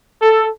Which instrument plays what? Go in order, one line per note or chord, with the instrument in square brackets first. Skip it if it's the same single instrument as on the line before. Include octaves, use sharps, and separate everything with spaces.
[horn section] A4